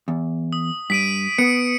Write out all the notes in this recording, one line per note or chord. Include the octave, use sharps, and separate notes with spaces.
E2
D#6
G2 B6 D7 D#7
B3 C#7